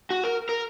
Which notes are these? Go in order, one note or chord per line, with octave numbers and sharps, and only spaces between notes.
F#4
A#4
A#4